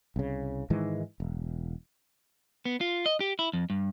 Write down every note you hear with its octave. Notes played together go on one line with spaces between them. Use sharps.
C2 C#3
G#2 D#3 E3 G#3
E1
B3
F4
D#5
G4
E4
F2
G2